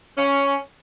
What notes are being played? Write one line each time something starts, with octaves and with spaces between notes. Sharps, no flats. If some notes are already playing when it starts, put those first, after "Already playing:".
C#4